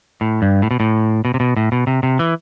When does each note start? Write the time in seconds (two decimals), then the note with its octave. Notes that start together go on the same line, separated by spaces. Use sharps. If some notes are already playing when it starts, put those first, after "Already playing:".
0.21 A2
0.42 G2
0.62 A2
0.71 B2
0.80 A2
1.25 B2
1.34 C3
1.40 B2
1.57 A2
1.72 B2
1.87 C3
2.03 C3
2.19 E3